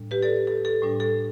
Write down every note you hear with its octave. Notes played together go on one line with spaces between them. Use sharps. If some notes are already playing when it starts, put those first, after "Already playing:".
Already playing: A2 G3 D4
G4 B4
A4 D5
A4
A4
A2 G3 D4
A4